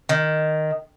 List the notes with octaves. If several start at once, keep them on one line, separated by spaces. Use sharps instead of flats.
D#3